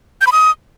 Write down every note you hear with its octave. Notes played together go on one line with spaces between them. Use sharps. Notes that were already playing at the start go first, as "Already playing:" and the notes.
G6
B5
D#6